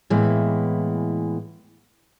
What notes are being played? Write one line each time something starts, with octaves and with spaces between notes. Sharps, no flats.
A2 E3 G#3 A#3 B3